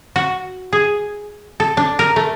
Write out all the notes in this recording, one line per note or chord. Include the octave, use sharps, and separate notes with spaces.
F#4
G#4
A4
D4
A#4
A3